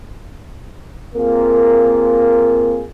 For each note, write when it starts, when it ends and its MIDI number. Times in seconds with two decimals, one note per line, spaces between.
1.15 2.84 58
1.15 2.84 60
1.15 2.84 65
1.15 2.84 68
1.15 2.84 70